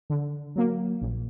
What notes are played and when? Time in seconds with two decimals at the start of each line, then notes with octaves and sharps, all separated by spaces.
0.10 D3
0.56 F#3 A#3
1.01 A#1